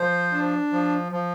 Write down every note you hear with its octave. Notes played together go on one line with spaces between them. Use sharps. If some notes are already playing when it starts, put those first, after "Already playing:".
Already playing: F3 C5
D4
F3
F3